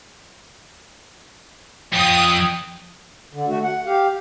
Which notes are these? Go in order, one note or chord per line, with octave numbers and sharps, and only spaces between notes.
F2 G5 D#6
D3
A3 F#4
F#5
G4 F5